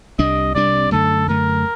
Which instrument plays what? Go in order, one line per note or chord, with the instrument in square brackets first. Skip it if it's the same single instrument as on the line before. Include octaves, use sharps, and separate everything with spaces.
[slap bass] C2 C3 G3 D4 [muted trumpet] D#5
[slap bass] C2 C3 G3 D4 [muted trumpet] D5
[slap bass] F#2 D3 A3 [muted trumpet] A4
[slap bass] F#2 D3 A3 [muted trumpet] A#4